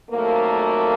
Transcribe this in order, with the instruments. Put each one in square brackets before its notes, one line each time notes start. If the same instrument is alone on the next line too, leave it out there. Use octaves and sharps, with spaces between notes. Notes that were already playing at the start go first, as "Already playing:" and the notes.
[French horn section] F2 D#3 F#3 A3 A#3